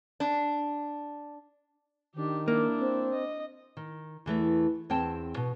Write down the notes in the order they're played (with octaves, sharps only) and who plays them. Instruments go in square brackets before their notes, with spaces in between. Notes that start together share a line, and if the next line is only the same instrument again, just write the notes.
[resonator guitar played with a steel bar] D4
[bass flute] D#3 [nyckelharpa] D4 G4
[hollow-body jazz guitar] A#3 [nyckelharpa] D4 E4
[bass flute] C4
[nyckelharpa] D#5
[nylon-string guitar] D#3
E2 E3 A3
E2 C4 G5 A5
B2